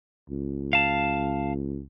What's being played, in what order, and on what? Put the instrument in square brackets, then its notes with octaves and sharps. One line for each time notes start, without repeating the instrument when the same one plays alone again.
[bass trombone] C#2
[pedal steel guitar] F5 A5